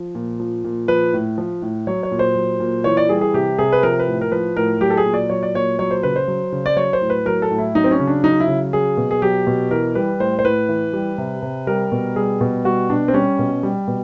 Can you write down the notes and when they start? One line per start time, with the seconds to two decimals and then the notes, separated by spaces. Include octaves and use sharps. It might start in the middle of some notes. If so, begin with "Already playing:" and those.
Already playing: F3
0.15 A#2
0.40 F3
0.64 A#2
0.88 F3 B4
1.13 A2
1.38 F3
1.62 A2
1.87 F#3 C#5
2.03 C#5
2.11 A#2
2.19 C5
2.36 F#3
2.60 A#2
2.84 E3 C#5
2.97 D5
3.09 G3 G#4
3.21 G#4
3.34 C3 G4
3.58 C3 G#4
3.72 B4
3.83 F3 A#4
3.99 B4
4.07 A2
4.21 A#4
4.32 F3 B4
4.56 A2 A#4
4.81 F#3 G4
4.90 A4
4.97 G#4
5.05 A#2
5.14 D5
5.29 F#3 C#5
5.43 D5
5.55 A#2 C#5
5.79 F#3 C#5
5.91 C5
6.03 C#3 B4
6.16 C5
6.28 F#3
6.52 C#3
6.66 D5
6.76 F#3 C#5
6.93 C5
7.01 A2
7.10 B4
7.26 F#3 A#4
7.42 A4
7.51 A2
7.58 E4
7.75 F#3 D#4
7.84 C4
7.91 C#4
8.00 C#3
8.07 D4
8.24 F#3 D#4
8.40 E4
8.48 C#3
8.73 F#3 G#4
8.97 B2
9.11 G#4
9.22 F#3 G4
9.47 B2
9.71 E3 A#4
9.95 G3 B4
10.20 A2 C5
10.39 C5
10.45 A2 B4
10.69 E3
10.93 G3
11.18 C3
11.42 C3
11.67 G3 A#4
11.92 B2
12.16 G3 G#4
12.41 B2
12.65 G3 F#4
12.90 B2 D4
13.08 C4
13.14 G3 C#4
13.39 B2
13.63 G3
13.87 B2